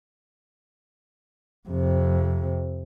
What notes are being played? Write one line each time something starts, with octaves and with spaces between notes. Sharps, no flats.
F2 C3